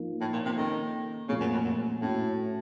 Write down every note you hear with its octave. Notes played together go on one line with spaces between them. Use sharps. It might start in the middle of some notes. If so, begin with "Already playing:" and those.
Already playing: F3 A#3 D#4
A2
A#2
C3
D#3 A#3 C#4 A4
A#2 C#3 F3 A3 C4 F4
F#2
F2
F#2
A2 A3 C#4 F#4